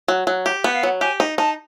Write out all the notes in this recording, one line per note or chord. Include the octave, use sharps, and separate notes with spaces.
F#3
F#3
G4
B3 F#5
F5
F#3 F#5
G4 G#5
D#4
D#4 A5